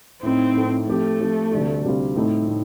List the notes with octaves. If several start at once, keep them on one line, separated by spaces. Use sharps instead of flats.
A2 A3 C4 D#4
A2 A3 D#4
F3 A3 C4 G4
F3 C4 G4
D2 C3 G3 D4 F4
D2 C3 G3 D4 F4
A2 A3 C4 D#4 A4
A2